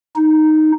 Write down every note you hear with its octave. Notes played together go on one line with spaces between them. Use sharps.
D#4